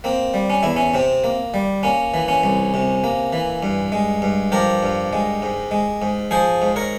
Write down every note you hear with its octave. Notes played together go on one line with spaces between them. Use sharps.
A#3 C4
G3
C#4
E2 E4
C#4
C3 C4
A#3
G3
A#3 C#4
E3
C#4
C2
C3
A#3
E3
G2
G#3
G2
F3 G4 A#4
G2
G#3
G#2
G#3
G#2
F3 G#4 C5
G#2
A#4 C#5